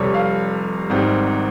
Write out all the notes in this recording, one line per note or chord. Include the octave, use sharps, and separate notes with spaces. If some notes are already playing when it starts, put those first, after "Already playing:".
Already playing: F1 F2 C3 G3 C#5
F5
G#1 G#2 G3 C4